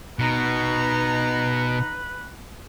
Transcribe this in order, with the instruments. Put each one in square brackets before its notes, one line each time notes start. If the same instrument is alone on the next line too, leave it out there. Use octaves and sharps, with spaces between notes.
[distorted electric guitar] B2 [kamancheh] D#4 A#5 [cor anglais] B4